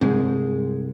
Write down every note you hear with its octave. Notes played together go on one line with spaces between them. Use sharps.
C2 G2 G#3 C4